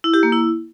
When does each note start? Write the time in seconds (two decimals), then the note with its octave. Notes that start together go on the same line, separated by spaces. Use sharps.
0.04 E4
0.14 G4
0.23 A#3
0.32 E4